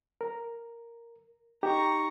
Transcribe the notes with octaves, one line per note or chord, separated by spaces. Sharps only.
A#4
D#4 G4 A#5 C#6